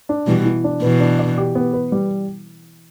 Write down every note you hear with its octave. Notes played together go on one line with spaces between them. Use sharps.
D4
B2 E3 G3
E3
D4
B2 E3 B4
D4
D5
G4
B3
B4
G3